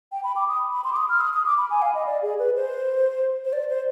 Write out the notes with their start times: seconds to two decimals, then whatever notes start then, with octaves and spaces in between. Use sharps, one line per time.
0.12 G5
0.24 B5
0.36 D6
0.48 D#6
0.73 B5
0.84 C6
0.93 D6
0.96 D#6
1.09 F6
1.21 D#6
1.33 D#6
1.45 D6
1.58 B5
1.70 G#5
1.82 F5
1.94 D#5
2.07 D5
2.22 G#4
2.39 B4
2.56 C5
3.45 C5
3.53 D5
3.69 C5